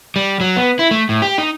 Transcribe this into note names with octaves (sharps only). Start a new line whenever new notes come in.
G3
F#3
B3
E4
A3
A2
G4
D#4